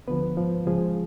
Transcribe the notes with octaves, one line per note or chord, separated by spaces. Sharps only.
D2 D3 F3 B3 B4
G#2 F3
C#2 C#3 F3 G#3 G#4